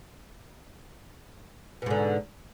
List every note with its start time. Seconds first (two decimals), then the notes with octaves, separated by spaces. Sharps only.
1.82 B2
1.86 G#2
1.90 D3